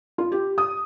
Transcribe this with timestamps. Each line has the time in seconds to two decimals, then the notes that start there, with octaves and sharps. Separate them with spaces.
0.18 F4
0.32 G4
0.58 D#6